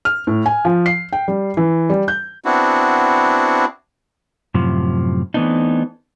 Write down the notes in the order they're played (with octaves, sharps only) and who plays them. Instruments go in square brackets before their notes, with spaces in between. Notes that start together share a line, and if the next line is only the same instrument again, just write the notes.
[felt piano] F6
A2
G#5
F3
C7
G5
G3
E3
G3
G6
[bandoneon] B3 C4 D4 E4 F#4
[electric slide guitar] F#2 A2 C3 F3
E3 A3 B3 C4 D4 D#4